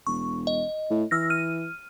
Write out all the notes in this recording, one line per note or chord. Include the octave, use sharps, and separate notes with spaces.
E1 C#6
D#5
A2
E3 E6 F6 A#6
F6 D#7